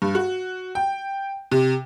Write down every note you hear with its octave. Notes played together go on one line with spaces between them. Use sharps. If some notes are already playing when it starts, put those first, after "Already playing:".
G2
F#4
G5
C3